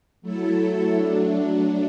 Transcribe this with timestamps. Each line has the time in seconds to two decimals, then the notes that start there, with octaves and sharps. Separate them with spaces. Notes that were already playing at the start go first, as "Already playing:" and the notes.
0.22 F#3 A3 E4 A4
0.91 F#3 A3 D4